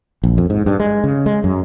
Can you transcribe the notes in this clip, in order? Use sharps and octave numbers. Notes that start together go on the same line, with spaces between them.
A#1
F2
G#2
G2
G#3
C#3
G#3
F#2